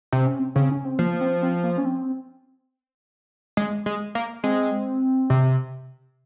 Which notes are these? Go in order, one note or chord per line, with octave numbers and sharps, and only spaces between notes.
C3 C4
C#4
C4
C#3 C4
C#4
C4
F3 A#3
C4
C4
A#3
C#4
C4
G#3
G#3
A#3
G#3 C4
C3